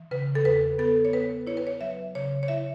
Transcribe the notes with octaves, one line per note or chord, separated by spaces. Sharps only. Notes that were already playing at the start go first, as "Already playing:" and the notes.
Already playing: E3
C#3 B4
A4
E2 B4
B3 A4
C#5
B3 B4
E4 C#5
B4
C#5
F#3 E5
C#3 C#5
C#5
E4 E5